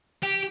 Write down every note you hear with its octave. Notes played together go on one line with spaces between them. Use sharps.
G4